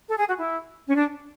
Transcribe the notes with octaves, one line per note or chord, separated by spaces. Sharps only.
A4
G#4
F#4
E4
C#4
D4